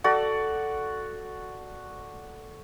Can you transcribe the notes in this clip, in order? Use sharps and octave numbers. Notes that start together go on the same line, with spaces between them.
F#4 A4 D5